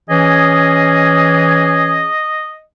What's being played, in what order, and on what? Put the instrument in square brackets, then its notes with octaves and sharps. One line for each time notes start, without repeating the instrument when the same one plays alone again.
[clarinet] E3 [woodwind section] C#4 G#4 [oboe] D#5